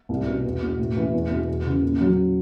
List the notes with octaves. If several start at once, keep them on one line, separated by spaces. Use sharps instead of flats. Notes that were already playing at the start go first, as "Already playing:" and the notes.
C2
B2
E2
B2
A2
E3
E2
B2
E2
C#3
A#2
F#3